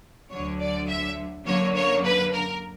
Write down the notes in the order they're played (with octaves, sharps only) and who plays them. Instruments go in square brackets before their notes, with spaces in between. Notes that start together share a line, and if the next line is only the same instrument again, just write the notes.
[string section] D2 D3 F#3 C#5
D5
E5
F#2 D3 A#3 C#5
C#5
B4
A#4